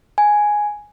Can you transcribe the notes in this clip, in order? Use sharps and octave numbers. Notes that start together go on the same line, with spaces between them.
G#5